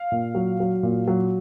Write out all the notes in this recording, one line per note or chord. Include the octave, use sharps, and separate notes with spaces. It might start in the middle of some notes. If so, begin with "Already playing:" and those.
Already playing: F5
A#2
F#3
F#3
A#2
F#3